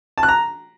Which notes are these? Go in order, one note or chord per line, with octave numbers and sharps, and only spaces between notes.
A5
F#6
A#5